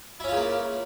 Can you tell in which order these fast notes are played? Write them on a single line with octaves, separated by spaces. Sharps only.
E4 C#4 F4 C#3 A#3